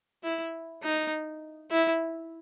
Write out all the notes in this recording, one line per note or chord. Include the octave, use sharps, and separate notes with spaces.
E4
D#4
E4